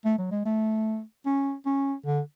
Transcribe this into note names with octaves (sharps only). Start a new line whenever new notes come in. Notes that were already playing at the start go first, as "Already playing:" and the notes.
A3
F#3
G#3
A3
C#4
C#4
D3